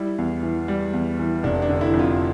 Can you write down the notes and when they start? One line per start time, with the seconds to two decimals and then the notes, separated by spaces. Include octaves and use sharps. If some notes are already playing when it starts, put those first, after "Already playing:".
Already playing: G3 E4
0.18 E2
0.43 E3
0.68 G3
0.93 E2
1.19 E3
1.43 F1 D4
1.62 D4
1.69 D3
1.81 E4
1.94 F2
1.99 F4